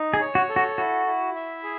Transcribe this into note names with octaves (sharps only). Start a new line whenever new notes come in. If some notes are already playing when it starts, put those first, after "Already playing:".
Already playing: D#4
G#4
C#5
F#4
A4
F#4
E4 F#4
E4
E5
G#4